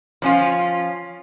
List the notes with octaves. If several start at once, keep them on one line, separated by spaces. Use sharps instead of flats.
F3 C#4 F4